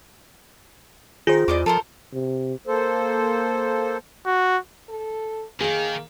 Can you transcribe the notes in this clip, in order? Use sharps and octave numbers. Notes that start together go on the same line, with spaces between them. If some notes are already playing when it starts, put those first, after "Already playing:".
D#3 F4 G#4 C5
E2 D5 D#5 D6
F3 A4 A#4 C5
C3
A#3 A4 C5
F#4
A4
D#3 A#3 G#4 A#4